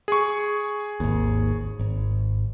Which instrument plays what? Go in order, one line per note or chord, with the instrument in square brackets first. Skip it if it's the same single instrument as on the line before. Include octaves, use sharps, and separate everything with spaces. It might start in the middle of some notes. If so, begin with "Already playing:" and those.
[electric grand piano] G#4 C#6
[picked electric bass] G#1 D#2
G#1